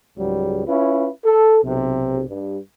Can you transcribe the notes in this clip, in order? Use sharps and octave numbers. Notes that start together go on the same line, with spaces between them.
C#2 G#2 F#3 G3
C#4 E4 F4 B4
A4
B1 C3
G2